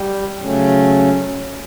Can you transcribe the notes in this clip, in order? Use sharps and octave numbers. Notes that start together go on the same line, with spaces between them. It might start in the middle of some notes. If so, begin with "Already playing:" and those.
Already playing: G3
C#3 F#3 A3 C#4